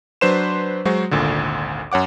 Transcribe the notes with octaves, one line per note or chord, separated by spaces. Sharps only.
F#3 D4 B4 C5 C6 E7
F#3 G#3 F#4 C5
G#1 D2 A#2 D3
F#2 C#5 F#5 D6